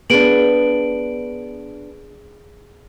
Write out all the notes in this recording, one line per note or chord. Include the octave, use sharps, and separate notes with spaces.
B3 D4 G#4 D7 F#7